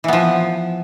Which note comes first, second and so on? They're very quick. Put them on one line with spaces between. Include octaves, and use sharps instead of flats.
E3 B3 F3